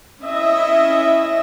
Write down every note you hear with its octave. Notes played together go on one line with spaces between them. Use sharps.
C#4 E4 D#5 E5